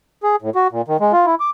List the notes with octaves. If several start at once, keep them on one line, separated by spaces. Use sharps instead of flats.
G#4
A2
F#4
A#2
D#3
G#3
F4
E4
D6